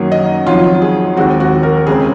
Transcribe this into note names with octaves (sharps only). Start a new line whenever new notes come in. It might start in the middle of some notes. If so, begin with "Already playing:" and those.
Already playing: F#2 D#3 F#3 A#3
D#5
F2 D#3 F#3 F4
G#4
D#2 D#3 G#3 C4 F#4
F#4
A#4
C#2 C#3 G#3 C4 G#4